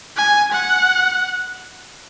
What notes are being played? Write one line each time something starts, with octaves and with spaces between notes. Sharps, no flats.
G#5
F#5